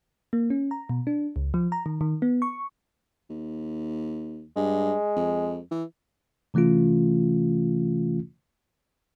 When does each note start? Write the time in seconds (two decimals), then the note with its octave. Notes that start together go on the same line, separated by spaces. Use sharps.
0.33 A#3
0.50 C#4
0.71 A#5
0.89 B2
1.07 D4
1.36 C#2
1.54 F3
1.72 A#5
1.86 D#3
2.01 D#3
2.22 B3
2.42 C#6
3.30 D#2
4.56 G2 G#3
5.16 F2
5.71 E3
6.54 C3 E3 A3 C#4 F4